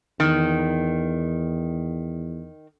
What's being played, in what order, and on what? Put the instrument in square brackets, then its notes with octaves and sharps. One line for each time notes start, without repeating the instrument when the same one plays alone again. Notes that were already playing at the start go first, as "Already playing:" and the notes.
[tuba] E2 [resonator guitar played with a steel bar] D#3